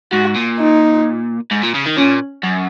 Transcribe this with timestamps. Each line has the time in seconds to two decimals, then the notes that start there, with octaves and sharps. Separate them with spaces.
0.12 G#2 F#4
0.35 A#2
0.59 D#4
1.51 G#2
1.63 A#2
1.74 C#3
1.86 D#3
1.97 A#2 C#4
2.43 F#2